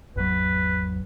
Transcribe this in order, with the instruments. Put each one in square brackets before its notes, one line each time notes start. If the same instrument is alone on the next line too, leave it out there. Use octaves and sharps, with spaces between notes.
[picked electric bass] G#1 E2 F#3 [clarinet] B4